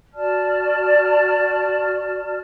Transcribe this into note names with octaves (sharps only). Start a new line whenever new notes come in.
F#4 D5 A5 F6